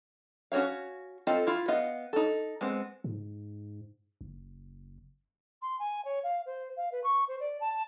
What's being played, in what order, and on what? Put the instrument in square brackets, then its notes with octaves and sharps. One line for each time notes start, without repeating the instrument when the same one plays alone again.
[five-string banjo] C#4 F#4 A4 C#5 F5
C4 F4 A4 D#5
E4 F4
B3 D#5 F5
D#4 A4
G#3 B3 C4
[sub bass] G#2
F#1
[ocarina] C6
G#5
C#5
F5
C5
F5
B4
C#6
C5
D5
A5